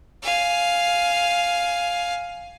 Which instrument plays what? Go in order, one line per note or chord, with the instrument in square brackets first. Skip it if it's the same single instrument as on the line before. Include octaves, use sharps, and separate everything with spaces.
[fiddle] F5 G#5